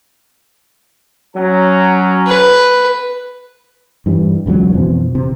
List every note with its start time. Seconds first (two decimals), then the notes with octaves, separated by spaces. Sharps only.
1.36 F#3 C#4 A#5
2.27 B4
4.06 G2 E3 G3
4.46 E1 C#2 D3 F#3
4.74 F2 B2 E3 C4
5.15 C3